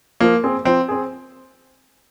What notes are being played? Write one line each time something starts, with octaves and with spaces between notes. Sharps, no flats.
F3 A#3
C4 G#4
F3 C4
C4 G#4